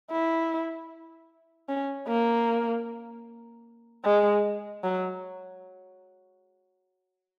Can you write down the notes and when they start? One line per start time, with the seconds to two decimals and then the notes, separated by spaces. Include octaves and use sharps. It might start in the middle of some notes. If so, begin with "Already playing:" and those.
0.11 E4
1.69 C#4
2.08 A#3
4.05 G#3
4.84 F#3